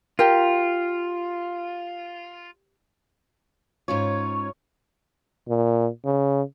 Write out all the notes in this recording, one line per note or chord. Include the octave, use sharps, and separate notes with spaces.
F4 G4 A#4
G#2 C#4 F4 C#5
A#2
C#3